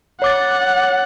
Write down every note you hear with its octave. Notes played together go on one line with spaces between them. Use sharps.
C#5 F#5 D6 A6